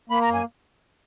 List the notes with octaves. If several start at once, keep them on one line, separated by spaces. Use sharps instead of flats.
A#3 B5
A#5
F#2
G#5